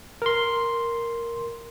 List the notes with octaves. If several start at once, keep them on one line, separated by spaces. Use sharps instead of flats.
A#4 C6